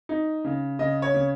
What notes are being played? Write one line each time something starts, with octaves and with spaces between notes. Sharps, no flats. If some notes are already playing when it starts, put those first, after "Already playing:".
D#4
C#3
C#3 D#5
C#5
C#3